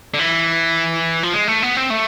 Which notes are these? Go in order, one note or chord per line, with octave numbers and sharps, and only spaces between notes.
D3
E3
F3
G#3
A3
B3
C4
A3